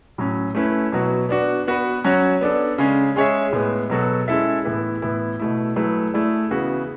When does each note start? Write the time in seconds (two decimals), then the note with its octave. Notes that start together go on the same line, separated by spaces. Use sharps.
0.18 A2 F#3 C#4
0.55 A3 C#4 E4 B4
0.92 B2 F#3 B3 F#4
1.29 B3 D4 F#4
1.67 B3 F#4 B4
2.04 F#3 C#4 F#4 C#5
2.41 B3 D4 A4
2.78 C#3 G#3 C#4
3.16 G#3 C#4 G#4 C#5 E5
3.53 A2 G#3 B3
3.90 B2 F#3 B3 F#4 A4
4.28 G#3 C#4 E4 A4 E5
4.65 A2 E3 B3 E4 B4
5.02 A2 E3 B3 E4
5.40 B2 A3 E4
5.76 F#3 A3 E4 G#4 B4
6.14 A3 E4 G#4 D5
6.51 C#3 E3 B3 F#4 B4